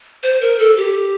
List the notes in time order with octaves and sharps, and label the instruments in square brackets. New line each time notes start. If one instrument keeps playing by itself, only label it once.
[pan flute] C5
A#4
A4
G4